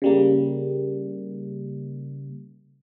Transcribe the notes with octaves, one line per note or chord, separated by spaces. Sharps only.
C#3 G3 A#3